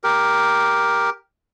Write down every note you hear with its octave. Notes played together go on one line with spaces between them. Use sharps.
G4 A#4